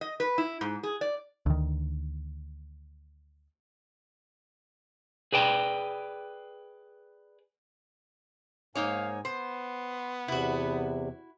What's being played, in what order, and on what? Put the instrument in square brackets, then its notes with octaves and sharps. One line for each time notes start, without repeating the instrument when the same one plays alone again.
[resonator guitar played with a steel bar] D#5
B4
E4
G#2
G#4
D5
[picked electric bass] D2 D#3
[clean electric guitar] G#4 B4 D5 G5
[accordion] G#2 G#5 [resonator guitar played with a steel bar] A#3 D#4 C#5 [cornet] F5
[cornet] B3 [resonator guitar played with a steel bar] C5 [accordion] C6
[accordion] E2 C3 [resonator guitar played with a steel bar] E4 F#4